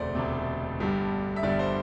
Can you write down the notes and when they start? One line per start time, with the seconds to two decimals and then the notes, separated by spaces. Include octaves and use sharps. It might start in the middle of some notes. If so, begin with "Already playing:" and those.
Already playing: E1 D2 C3 A3 C5 D5
0.15 E1 D2 C3 A3
0.79 G1 G2 D3 G3
1.36 E5
1.43 G1 G2 D3 G3 D5
1.59 C5